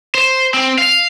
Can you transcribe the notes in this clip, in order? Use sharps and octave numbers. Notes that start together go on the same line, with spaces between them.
C5
C4
F5